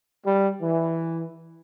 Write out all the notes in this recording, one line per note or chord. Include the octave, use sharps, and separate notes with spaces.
G3
E3